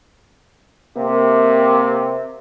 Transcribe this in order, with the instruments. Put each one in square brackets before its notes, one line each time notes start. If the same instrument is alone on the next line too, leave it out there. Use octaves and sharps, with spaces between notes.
[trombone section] C3 [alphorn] A#3